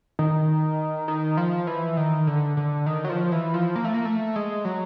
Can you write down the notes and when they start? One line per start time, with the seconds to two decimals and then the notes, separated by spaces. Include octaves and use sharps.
0.19 D#3
1.08 D#3
1.37 F3
1.67 E3
1.97 D#3
2.27 D3
2.57 D3
2.86 D#3
3.05 F#3
3.09 F3
3.32 E3
3.54 F3
3.76 A#3
3.85 A3
3.94 A#3
4.05 A3
4.36 G#3
4.65 F#3